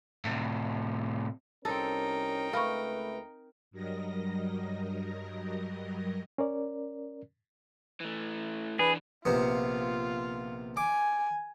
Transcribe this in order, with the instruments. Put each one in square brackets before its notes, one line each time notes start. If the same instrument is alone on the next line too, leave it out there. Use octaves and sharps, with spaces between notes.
[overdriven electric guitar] A2 C3
[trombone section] C2 C#4 A#4 [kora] C4 A4 [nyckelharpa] D#4 G5
[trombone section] C#2 A3 B4 [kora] A#4 [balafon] F5 B5 C#6
[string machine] G2 F#3 G3 A#4 D#5 A#6
[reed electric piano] C#4 A#4 D5
[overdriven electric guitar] E3 A3
[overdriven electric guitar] E3 D4 [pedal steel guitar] G#4 [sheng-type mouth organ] B4
[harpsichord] A#1 C3 B3 [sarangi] F4
[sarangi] G#5 [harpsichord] D6